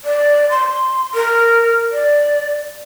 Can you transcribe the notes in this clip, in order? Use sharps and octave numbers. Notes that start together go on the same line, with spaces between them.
D5
C6
A#4
D5